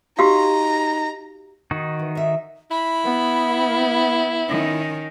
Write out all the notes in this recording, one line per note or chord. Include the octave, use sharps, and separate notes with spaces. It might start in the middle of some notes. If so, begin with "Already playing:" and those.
D#4 F#4 G4 F5 A#5
D#3 D#4 F#4
E3
A#4 E5
E4 B5
B3
D#3 C#4